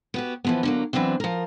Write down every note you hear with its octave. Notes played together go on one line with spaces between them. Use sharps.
B3 F#4 G4
E3 F3 B3
D3 F#3 A#3
E3 F#3 B3 C4 D4
F3 A#4